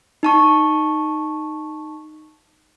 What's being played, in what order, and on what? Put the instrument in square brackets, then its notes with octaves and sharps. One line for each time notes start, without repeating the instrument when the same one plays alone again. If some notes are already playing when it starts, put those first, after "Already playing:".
[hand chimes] D#4 A5 C#6